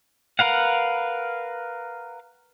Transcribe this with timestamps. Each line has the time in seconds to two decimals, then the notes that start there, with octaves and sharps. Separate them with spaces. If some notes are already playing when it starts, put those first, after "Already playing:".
0.39 A#4 B4 F5 F#5